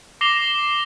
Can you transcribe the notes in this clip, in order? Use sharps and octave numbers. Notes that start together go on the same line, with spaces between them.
D6 A#6 C7 E7 F7 G7